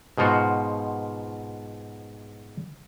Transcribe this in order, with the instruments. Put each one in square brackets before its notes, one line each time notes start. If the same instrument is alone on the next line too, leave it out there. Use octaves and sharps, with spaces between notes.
[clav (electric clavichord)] G#2 B2 F3 F4 F#4